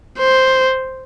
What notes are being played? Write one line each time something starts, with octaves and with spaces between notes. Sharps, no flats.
C5